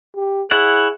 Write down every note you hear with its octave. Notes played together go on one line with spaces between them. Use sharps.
G4
E4 G#4 C#5 F#5